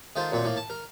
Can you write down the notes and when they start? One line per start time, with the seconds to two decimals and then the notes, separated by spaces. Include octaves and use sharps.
0.16 D#3 A3 F4 C5
0.31 F#2 A#2 C4
0.44 A2 A#3
0.57 A5
0.70 A#4